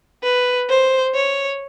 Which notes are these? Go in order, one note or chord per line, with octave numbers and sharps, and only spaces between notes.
B4
C5
C#5